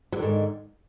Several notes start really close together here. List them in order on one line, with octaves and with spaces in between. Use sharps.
F#3 D3 D#3 G#2